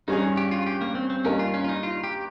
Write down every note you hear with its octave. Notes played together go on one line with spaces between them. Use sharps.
G2 G3 C#4 D#4 G#4
G4
F4
G4
A#3
C4
C4
G2 G3 A#3 C#4 D#4 A#4
F4
C#4
F4
D#4
F4
G4